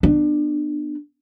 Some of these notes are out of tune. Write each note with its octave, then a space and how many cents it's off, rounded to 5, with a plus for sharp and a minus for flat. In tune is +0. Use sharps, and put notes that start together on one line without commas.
B3 +0 D4 +25